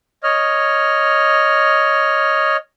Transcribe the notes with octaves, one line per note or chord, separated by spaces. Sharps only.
C#5 D#5 F6